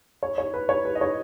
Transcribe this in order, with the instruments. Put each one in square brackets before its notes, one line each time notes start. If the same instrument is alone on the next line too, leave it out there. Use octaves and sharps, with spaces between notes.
[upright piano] C#5
C#5
B4
C#5
B4
D#5
C#5